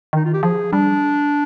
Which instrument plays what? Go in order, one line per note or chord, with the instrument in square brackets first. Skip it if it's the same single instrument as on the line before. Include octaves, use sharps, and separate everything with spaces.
[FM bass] D#3 [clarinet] D#4
[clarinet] F4
G4
[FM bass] F3 [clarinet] G#4
[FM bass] G3 [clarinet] D4